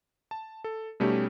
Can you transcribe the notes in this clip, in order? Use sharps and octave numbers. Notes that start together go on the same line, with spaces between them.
A5
A4
B2 G3 A3 C#4 D#4 G4